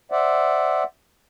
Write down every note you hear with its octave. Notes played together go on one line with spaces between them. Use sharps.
C5 D5 E5 F#5